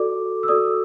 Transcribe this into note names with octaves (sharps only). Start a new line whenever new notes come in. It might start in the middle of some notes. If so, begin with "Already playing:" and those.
Already playing: F#4 A4 D5 D6
E6
F#4 A4 D5 D#6